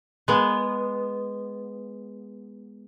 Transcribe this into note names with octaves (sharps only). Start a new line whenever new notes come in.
G#3 B3